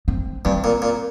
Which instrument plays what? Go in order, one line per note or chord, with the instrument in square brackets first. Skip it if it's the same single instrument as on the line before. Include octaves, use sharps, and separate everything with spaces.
[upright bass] C4
[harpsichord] G2 [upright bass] C4
[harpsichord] A#2
A#2